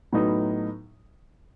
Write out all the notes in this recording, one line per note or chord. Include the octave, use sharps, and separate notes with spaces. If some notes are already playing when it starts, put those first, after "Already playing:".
A2 F#3 B3 D#4